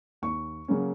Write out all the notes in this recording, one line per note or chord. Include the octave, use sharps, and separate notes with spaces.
D#2 C#6
C#3 F#3 A#3 C#4